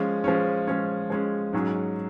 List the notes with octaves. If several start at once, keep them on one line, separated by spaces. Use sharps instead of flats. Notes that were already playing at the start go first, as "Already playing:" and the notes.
Already playing: F3 G#3 C#4
F3 G#3 C#4
F3 G#3 C#4
F3 G#3 C#4
G#2 F#3 C#4 G#4